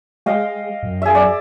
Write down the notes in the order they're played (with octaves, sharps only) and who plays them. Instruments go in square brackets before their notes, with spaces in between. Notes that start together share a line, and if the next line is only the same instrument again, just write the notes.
[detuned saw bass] G#3 [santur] D#5 F5 G5
[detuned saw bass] F#2
[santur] G#4 E5
D5